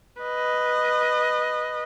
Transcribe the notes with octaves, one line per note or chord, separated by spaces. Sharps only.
B4 D#5